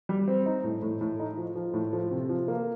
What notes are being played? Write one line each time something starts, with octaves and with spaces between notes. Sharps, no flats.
G3
C4
D#4
A2
A2
A2
D#4
F3
F3
A2
F3
C3
F3
A#3